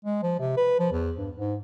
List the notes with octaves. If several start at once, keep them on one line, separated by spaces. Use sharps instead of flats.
G#3
F3
C3
B4
F3
E2
G2
G#2